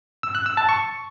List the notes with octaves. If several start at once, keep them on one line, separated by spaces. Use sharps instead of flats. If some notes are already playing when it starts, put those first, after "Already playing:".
E6
F#6
E6
A5
C#6